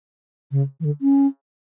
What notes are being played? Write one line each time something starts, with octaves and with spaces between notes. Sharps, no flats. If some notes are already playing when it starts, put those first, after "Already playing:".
C#3
E3
D3
C#4